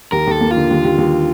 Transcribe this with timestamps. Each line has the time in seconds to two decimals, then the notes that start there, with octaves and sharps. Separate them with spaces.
0.12 D#2 A#4
0.27 D#2 A4
0.41 A#3
0.51 F4
0.56 D3
0.71 D#2
0.84 D#2
0.98 D#2